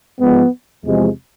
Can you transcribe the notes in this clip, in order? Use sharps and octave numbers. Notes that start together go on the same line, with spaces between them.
G#2 F3 G#3 B3
E2 C3 F3 G#3